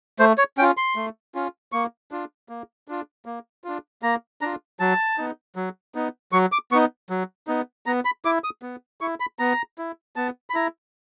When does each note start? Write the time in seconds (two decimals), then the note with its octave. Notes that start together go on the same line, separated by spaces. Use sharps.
0.19 A3 C5
0.38 C#5
0.58 C#4 G5
0.62 F4
0.77 C6
0.96 A3
1.35 C#4 F4
1.72 A#3 C#6
2.11 D4 F4
2.49 A#3
2.88 D4 F4
3.26 A#3
3.64 D4 F4
4.02 A#3 A#5
4.41 D4 F4 A#5
4.79 F#3 A5
5.18 B3 D#4
5.56 F#3
5.95 B3 D#4
6.32 F#3 C#6
6.52 D6
6.72 B3 C#6
6.75 D#4
7.10 F#3
7.47 B3 D#4
7.86 B3 A#5
8.05 B5
8.25 E4 D6
8.44 D#6
8.63 B3
9.01 E4 C#6
9.20 B5
9.39 B3 A#5
9.78 E4
10.16 B3 A5
10.50 B5
10.54 E4 A#5